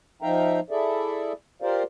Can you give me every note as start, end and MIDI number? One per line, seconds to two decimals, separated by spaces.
0.22 0.60 53
0.22 0.60 63
0.22 0.60 76
0.22 0.60 77
0.22 0.60 79
0.22 0.60 82
0.70 1.32 64
0.70 1.32 68
0.70 1.32 69
0.70 1.32 74
0.70 1.32 76
1.62 1.83 65
1.62 1.83 67
1.62 1.83 70
1.62 1.83 72
1.62 1.83 74
1.62 1.83 77